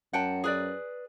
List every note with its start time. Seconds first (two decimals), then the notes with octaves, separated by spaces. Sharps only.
0.13 F#2 F#5 G5 A5
0.44 G#4 B4 D5